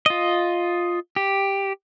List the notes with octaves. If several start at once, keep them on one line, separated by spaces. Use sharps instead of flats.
F4 D#5
G4